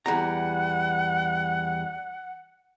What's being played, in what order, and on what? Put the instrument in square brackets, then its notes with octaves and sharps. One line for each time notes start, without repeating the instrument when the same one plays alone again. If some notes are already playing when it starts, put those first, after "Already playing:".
[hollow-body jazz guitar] E2 G3 A#5 [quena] F#5